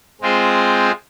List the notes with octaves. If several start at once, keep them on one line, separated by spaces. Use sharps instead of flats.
G#3 C4 F4 G#4 C5